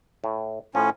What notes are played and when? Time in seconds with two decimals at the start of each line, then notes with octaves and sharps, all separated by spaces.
0.24 A2
0.75 A2 F3 C#4